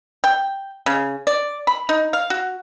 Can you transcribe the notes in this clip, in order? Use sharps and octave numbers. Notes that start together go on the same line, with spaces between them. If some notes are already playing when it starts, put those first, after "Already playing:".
G5
C#3
D5
B5
D#4
F5
F#4